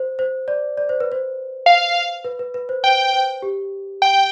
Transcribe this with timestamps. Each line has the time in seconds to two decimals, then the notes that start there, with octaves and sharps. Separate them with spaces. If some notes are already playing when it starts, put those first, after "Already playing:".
Already playing: C5
0.19 C5
0.48 D5
0.78 D5
0.89 C5
1.00 B4
1.12 C5
1.66 F5
2.25 B4
2.39 B4
2.54 B4
2.69 C5
2.83 C5 G5
3.13 C5
3.42 G4
4.02 G5